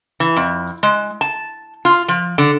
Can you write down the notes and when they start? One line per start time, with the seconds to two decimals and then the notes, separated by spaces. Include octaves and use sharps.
0.20 E3
0.37 F2
0.83 G#3
1.21 A5
1.85 F4
2.08 F3
2.38 D3